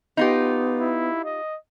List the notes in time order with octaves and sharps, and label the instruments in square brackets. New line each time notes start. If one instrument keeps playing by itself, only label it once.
[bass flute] B3 [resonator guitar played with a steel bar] D#4 F4 G4
[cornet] E4
D#5